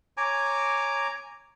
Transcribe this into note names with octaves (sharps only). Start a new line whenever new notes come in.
C#5 G#5 A#5 D6